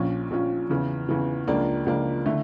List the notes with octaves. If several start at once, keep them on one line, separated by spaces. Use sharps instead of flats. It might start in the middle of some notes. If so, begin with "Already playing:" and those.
Already playing: A#1 A#2 F3 C#4 F4
A#1 A#2 F3 C#4 F4
E2 C#3 E3
E2 C#3 E3
C#2 C#3 F3 A#3 D4
C#2 C#3 F3 A#3 D4
D3 A3 E4